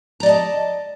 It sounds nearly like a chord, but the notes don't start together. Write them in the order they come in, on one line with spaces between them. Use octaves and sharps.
A#5 D5 D#5 A5